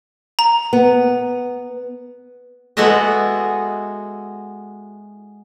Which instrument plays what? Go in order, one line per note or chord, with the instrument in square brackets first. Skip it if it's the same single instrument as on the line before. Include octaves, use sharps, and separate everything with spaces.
[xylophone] A#5
[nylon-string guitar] B3
[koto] G#3 B3 E4 F#4 A4 D#5